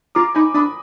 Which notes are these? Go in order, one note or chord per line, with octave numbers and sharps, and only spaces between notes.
F4 A#5 D6
D#4 G#5 B5
D4 B5 D#6